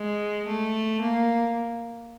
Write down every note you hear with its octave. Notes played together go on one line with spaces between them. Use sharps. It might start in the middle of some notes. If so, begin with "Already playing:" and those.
Already playing: G#3
A3
A#3